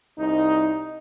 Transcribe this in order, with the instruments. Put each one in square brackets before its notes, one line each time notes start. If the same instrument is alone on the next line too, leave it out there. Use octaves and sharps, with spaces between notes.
[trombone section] C2 D#4